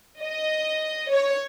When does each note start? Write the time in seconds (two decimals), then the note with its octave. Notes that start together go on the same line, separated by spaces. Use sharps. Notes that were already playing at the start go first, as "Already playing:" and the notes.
0.21 D#5
1.10 C#5